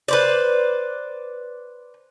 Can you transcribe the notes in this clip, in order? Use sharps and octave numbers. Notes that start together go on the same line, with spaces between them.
B4 C5 D5